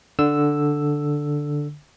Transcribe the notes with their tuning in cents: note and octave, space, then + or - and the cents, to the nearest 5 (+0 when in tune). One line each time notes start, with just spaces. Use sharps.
D3 +0 E6 +0